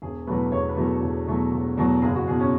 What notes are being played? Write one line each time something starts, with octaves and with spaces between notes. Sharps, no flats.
E1 G#4
E2 B2 F#3 A3 B4
E1 C#5
B4
E2 B2 F#3 A3
A4
E1
E2 B2 F#3 A3
E1
E2 B2 F#3 A3
F#1 G#4
F#4
E2 B2 G#4
C#4